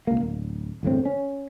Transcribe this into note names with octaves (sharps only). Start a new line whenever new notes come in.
C#2 A#3
D1
G1 E2 A2 C4
C#4